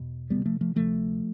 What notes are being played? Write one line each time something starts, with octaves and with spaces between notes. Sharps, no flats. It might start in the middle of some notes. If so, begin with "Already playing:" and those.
Already playing: E2 B2
D2 C3 G3 B3
F3 A3
F3 A3
D2 C3 F3 A3